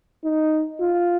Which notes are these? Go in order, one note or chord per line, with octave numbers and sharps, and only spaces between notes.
D#4
F4